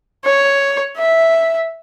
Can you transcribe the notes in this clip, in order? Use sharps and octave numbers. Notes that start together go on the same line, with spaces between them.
C#5
E5